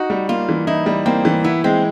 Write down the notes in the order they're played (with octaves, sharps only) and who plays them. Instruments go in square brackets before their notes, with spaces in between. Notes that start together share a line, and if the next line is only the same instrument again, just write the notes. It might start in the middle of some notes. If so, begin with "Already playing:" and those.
Already playing: [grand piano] D#4 [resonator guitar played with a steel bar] F#4
[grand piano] G3
[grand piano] A#3 [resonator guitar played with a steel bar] F4
[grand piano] E3
[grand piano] D#4 [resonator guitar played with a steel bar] E4
[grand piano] G3
[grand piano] A#3 [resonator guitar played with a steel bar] C4
[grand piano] E3
[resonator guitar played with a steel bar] B3 [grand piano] E4
[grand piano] G#3 [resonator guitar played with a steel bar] C4